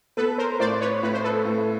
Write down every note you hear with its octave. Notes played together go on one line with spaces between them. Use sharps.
B3 A4 B4
A#4 C5
A2 C5 D5
B4 C#5
A2 B4
C5
A4 B4
A2